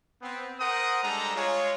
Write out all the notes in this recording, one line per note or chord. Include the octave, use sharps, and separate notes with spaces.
B3 C4
A#4 C5 F#5 D#6
G3 G#3 D4 A4 A#5
G#3 F4 G#4 C#5